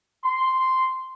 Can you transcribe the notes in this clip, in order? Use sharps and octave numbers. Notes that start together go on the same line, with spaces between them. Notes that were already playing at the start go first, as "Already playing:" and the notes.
C6